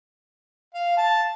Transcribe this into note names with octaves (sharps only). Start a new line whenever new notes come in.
F5
A5